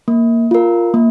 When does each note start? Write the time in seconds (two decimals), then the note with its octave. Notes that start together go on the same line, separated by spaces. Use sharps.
0.08 A#3
0.51 F4 A#4
0.94 A#3